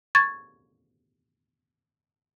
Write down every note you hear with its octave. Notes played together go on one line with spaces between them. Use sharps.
C#6 G#6 A6